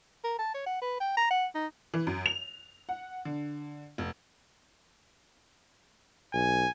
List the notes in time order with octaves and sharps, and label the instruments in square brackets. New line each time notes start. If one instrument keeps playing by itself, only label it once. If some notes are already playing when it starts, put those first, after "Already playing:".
[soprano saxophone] A#4
A5
C#5
F#5
B4
G5
A#5
F#5
D#4
[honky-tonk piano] E3
F#2
F7
F#5
D3
F1
[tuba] B1 [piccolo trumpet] G#5